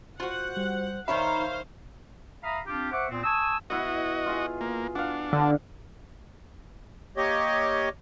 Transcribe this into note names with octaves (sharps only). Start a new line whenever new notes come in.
F4 F#4 C5 F#5
G3
D#3 D#4 C5 C#5 E5 F5 A#5 B5
E5 F5 A#5 B5 D#6
C4 D4 F4 G4
C5 E5 F#5 C#6 D6
A#2 B3 C4
G#5 A5 C#6 D#6 E6
B2 E4 F#4 D#5 F#5
F4 G#4
A#3
D4 F5 F#5
D3
A#3 G4 C#5 D#5